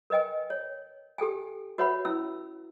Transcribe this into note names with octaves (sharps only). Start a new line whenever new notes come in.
A#4 B4 D#5 G5 G#5
C#5
G4 A4 G5 G#5
F#4 B4 C#5 E5 F#5 B5
C#4 E4 E6